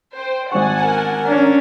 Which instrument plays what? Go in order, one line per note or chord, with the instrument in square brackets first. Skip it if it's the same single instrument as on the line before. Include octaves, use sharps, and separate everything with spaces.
[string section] C5 G5
[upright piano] G#1 C5 C#6 [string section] F#5 G#5 A5
[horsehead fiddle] A#4
[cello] C#4 D4